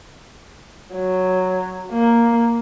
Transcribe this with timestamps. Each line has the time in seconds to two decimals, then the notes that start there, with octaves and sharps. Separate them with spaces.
0.94 F#3
1.92 A#3